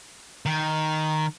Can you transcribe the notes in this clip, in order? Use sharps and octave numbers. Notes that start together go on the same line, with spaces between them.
D#3